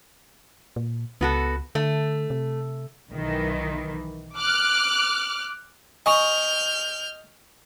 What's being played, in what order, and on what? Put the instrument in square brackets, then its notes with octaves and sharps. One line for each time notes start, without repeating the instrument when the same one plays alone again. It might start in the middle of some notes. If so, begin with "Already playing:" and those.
[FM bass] A#2
[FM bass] C#2 [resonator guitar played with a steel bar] B3 F#4 A4
[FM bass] D3 [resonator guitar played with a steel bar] A3
[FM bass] C3
[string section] B1 D#3 E3
D6 F6 F#6
[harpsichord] D#5 [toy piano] G#5 C#6 [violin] F6 G6